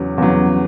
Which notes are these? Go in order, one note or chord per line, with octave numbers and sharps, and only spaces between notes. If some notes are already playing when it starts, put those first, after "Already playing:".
Already playing: E2 C#3 F#3
E2 C#3 F#3